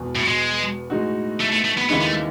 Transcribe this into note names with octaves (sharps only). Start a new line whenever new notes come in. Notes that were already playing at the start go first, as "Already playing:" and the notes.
Already playing: E1 E2 B2
A2
G#3
A2 G#3 D#4 F#4
A3
A3
A3
B3
D#2 C#3 E3 G#3 B3 D#4
B3
A3